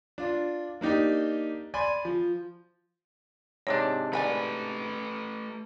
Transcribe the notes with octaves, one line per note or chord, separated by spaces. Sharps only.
D4 F4
A#3 D4 D#4 G4
D5 G#5 B5 C6
F3
G#2 C3 D4 C#5
A3 B4 D5 G#5 B5